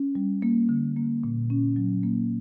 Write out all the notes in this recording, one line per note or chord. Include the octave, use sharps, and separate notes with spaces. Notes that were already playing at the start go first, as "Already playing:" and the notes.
Already playing: C#4
G3
A#3
D3
A#3
A#2
C#4
F#3
A#3